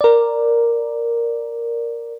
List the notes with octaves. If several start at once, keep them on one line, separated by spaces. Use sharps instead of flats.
A#4 D5